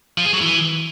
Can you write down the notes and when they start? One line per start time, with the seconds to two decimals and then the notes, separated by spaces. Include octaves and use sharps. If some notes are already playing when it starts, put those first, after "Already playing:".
0.18 F3
0.25 G#4
0.33 F#3
0.41 E3